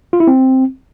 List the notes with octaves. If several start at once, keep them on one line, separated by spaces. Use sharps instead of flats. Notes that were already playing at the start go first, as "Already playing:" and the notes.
F4
E4
C4